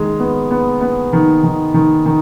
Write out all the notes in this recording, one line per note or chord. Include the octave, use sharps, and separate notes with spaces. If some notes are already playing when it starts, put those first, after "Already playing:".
Already playing: D#3 G#3
B3
B3
B3
D#3
D#3
D#3
D#3